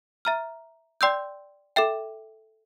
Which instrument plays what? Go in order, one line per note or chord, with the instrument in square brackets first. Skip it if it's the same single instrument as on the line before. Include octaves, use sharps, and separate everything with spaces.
[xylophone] E5 A#5 F6
D5 G5 C6 E6 G6
A4 E5 G5